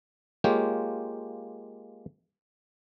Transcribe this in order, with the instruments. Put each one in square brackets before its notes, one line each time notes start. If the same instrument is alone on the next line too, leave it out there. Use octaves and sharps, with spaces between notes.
[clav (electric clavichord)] G#3 A#3 F4 G4 C#5